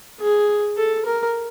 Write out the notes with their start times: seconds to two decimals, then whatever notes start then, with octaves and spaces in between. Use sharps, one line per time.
0.21 G#4
0.78 A4
1.06 A#4